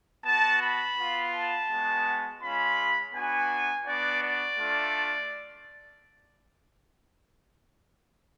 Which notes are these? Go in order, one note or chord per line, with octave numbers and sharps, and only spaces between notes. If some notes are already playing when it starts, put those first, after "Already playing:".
B3 F#4 A5
B5
B3 F4
A5
G#3 B3 F#4
G#3 C#4 F4 B5
B3 D4 F#4 G#5
B3 D4 F#4 D5
D5
A3 D4 F4